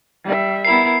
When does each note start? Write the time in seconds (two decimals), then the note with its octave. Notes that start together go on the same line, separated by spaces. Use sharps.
0.25 G3 E5
0.65 B3 E4 A#4 C7